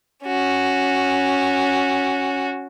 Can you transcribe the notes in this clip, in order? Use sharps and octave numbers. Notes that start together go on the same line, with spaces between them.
C#4 F#4